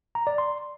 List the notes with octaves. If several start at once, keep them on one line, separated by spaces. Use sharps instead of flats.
A#5
D5
C6